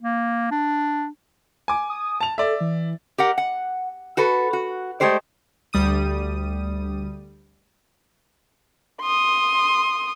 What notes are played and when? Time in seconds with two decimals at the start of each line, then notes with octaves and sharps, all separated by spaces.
0.02 A#3
0.51 D4
1.68 G#5 D6
1.90 D#6
2.21 A5 F7
2.38 A4 D5 E5
2.61 E3
3.18 G4 A#4 F#5
3.38 F#5
4.17 F#4 A4 B4
4.53 F#4
5.00 G#3 A3 G4 C5 D5
5.73 D2 G3 D#6 D#7
9.02 C6 D#6